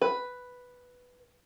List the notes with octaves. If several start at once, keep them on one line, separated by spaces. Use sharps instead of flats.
B4